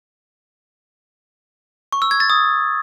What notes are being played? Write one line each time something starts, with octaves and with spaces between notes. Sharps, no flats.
C#6
E6
G#6
A6
D#6